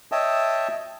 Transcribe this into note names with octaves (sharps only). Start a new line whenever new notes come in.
C#5 D#5 E5 G5 A5 D#6